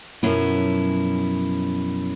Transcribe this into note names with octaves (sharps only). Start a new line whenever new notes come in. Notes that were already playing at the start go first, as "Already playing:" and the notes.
F#2 B2 F3 C#4 E4